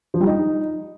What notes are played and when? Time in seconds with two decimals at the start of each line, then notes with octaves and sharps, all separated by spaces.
0.14 F3
0.20 G3
0.27 D#4